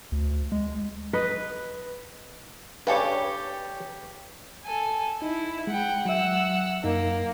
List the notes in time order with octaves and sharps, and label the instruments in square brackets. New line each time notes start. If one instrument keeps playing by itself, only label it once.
[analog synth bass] D2
G#3
[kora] B4 D#5
[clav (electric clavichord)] G2 C#3 G3 [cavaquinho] G4 A4 G5 [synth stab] B4 C#5
[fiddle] A4 G#5
[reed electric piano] D#4 [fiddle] E4
[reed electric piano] G#3 [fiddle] F#5 G5
[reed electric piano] F#3 E5 [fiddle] F#5 E6
[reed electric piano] F#2 D#4 [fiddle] A#3